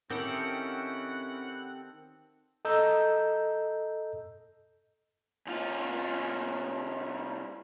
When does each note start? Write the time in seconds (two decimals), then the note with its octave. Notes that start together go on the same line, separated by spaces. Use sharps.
0.10 D#3 C4 C#4 E4 G4 A4 F#5
2.65 A4 D#5 A#5 E6 G6
5.47 C2 F4